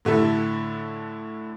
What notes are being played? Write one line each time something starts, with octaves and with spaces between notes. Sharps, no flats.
A2 D3 E4 A4